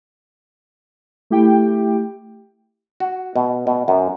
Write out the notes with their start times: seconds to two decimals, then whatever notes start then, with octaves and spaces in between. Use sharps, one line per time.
1.30 A3 E4 G4 G5
3.00 F#4
3.36 B2
3.67 B2
3.88 F#2